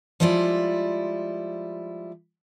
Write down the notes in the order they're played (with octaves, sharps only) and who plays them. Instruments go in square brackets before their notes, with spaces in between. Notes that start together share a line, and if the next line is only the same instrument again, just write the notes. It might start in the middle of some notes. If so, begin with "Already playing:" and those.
[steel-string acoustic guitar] F3 G3 G#3 E4 F4 D5